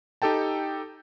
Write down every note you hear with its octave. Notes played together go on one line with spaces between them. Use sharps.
D#4 G4 A4 G5 A5